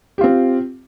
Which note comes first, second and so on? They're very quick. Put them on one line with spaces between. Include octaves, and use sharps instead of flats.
G4 F4 C4